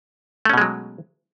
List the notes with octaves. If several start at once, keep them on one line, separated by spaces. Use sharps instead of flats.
B2 F#3 G#3 A3 C#4